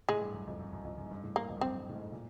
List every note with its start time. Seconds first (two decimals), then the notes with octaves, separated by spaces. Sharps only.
0.09 A2 G#3
0.21 G2
0.34 F#2
0.47 F2
0.59 F#2
0.73 F#2
0.84 F2
0.98 F#2
1.05 G#2
1.11 G2
1.23 A2
1.35 G2 A#3
1.49 F2
1.56 G2
1.61 F#2 C4
1.78 G2
1.89 A2
1.95 G#2
2.12 A#2